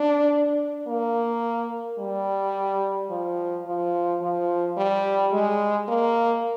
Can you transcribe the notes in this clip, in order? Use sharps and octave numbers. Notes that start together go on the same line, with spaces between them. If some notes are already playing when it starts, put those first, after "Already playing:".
Already playing: D4
A#3
G3
F3
F3
F3
G3
G#3
A#3